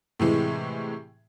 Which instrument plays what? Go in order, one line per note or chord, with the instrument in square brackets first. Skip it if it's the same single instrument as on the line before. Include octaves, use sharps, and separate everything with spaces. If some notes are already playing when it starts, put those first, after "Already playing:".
[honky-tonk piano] A2 C3 E3 G#3